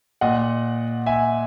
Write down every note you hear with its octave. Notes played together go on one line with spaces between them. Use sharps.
A#2 D#5 F#5
E5 G#5